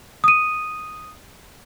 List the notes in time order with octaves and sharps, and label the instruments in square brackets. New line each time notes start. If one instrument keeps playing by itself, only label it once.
[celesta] D#6 D#7